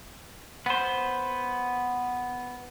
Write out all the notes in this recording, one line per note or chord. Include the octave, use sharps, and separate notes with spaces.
B3 C5